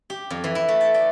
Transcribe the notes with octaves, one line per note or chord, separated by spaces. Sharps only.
G4
F2
E3
E4
A3
A5
D5